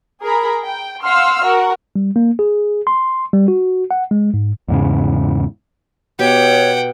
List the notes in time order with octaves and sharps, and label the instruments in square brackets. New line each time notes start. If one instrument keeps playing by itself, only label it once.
[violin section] G#4 A#4 A#5 B5
G5
F5 F#5 C6 E6 F6
F#4 A#4 F#5
[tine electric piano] G3
A#3
G#4
C6
G3
F#4
F#5
G#3
G#2
[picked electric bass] E2 G#2 C#3
[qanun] B2 G4 [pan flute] C#5 [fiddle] F#5 G5